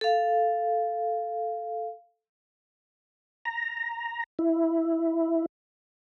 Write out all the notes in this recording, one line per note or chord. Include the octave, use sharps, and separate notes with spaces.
A4 F5
A#5
E4